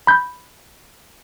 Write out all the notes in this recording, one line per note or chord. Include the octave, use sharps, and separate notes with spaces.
B5 G6